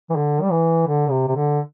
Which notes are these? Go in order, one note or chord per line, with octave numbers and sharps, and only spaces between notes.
E3
D3
G3
E3
D3
C3
C3
D3